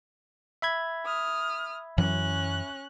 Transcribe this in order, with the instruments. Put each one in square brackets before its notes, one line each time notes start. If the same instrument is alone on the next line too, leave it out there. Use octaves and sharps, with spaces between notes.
[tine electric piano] E5 B5 G#6
[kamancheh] D#6 F6
[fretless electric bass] F#2 E3 F#3 [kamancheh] C#4 F#6